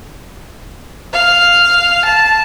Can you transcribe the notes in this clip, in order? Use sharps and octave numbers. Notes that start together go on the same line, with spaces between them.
F5
A5